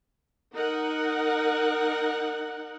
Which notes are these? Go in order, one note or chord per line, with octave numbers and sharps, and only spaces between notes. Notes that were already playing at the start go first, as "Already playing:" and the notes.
D#4 A#4 F#5